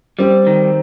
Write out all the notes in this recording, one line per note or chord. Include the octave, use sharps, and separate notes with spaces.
G3 C4
D#3